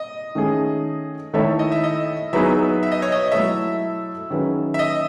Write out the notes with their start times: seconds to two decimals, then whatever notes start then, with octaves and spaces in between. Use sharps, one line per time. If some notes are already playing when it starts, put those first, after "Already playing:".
Already playing: D#5
0.35 D#3 A3 C#4 G#4
1.33 D#3 A3 E4 A4 C#5 E5
1.59 D#5
1.72 E5
1.84 D#5
2.33 F#3 B3 D#4 G#4 B4 E5
2.83 E5
2.92 D#5
3.02 C#5
3.12 D#5
3.32 F#3 A3 E4 A4 C#5 E5
4.30 D#3 F#3 C#4 G#4 B4
4.74 E5
4.79 D#5